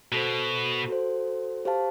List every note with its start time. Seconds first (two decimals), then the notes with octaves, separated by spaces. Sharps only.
0.12 B2 F#4 A4 C5
0.88 F#4 A4 C5
1.65 G4 C5 F5 A5